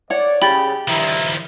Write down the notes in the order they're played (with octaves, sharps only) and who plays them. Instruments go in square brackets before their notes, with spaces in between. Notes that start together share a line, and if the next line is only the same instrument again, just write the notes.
[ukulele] C#5 F#5 [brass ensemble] D5
[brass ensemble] C#3 [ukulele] G4 [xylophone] B5 A6
[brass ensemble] G2 E4 A#5 [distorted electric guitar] D#3 F3